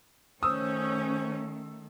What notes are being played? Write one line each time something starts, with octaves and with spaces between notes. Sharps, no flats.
D#3 A3 C#4 C5 D#6 E6